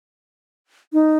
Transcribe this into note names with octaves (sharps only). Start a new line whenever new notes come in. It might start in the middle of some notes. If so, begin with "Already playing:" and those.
D#4